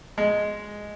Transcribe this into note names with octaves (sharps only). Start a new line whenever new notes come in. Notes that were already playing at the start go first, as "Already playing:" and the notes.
G#3